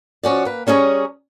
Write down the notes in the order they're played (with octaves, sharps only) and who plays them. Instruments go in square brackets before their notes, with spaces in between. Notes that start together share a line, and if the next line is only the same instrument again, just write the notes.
[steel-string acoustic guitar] F3 C#4 F#4 D5
A#3 B4
G3 C#4 D4 G#4 C#5 A#5